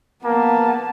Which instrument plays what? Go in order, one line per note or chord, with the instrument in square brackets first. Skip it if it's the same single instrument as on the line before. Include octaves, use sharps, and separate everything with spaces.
[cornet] A#3 [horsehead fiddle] B3 A5